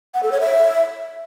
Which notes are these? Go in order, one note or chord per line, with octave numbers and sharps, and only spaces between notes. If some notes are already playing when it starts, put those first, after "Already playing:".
F#5
A4
C#5
E5